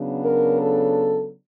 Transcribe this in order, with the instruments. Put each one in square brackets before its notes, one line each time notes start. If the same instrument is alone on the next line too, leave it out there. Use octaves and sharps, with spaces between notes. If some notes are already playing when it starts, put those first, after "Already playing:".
Already playing: [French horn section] C#3 F#3 B3 D4
A#4
A4